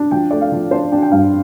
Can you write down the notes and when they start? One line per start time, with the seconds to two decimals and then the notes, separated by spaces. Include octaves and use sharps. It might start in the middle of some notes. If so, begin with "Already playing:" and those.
Already playing: D4
0.11 F3 G5
0.31 A3 D5
0.41 F5
0.52 F3
0.71 D4 C5
0.92 D4 G5
1.02 G5
1.11 G2 F5